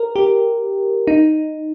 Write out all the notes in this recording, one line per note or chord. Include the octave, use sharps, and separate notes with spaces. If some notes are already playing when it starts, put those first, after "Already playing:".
Already playing: A#4
G4
D#4